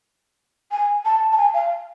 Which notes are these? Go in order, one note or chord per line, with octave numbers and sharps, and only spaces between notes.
G#5
A5
A5
G#5
F5